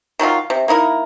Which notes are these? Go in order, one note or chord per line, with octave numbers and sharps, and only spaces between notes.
D#3 F#3 D#4 F4
C3
A#3 D#4 E4 A#4